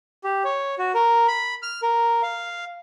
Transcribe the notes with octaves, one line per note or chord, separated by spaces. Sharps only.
G4
C#5
F#4
A#4
B5
F6
A#4
F5